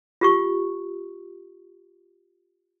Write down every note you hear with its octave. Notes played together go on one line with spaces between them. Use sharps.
F4 G4 C#6